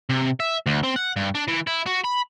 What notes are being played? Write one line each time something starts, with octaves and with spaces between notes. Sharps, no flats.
C3
E5
D2
C4
F#5
G2
D4
E3
E4
F#4
B5